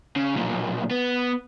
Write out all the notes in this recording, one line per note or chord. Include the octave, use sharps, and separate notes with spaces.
C#3
B1 A#2
B3